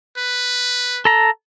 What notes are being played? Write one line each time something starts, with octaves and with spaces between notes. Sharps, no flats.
B4
A4 A#5